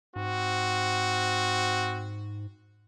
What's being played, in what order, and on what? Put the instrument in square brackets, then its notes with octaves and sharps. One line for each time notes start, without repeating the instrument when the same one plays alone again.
[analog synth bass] G#2 [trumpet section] C4 F#4